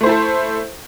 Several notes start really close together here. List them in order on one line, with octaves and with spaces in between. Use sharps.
A3 C5 E4 A4